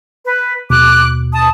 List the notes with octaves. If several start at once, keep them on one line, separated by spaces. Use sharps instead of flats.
B4
D#2 B2 D6 F#6
A5 D#6